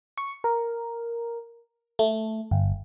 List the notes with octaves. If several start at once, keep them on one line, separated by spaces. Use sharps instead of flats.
C#6
A#4
A3
G1